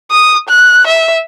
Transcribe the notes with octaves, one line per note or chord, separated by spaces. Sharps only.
D#6
F#6
E5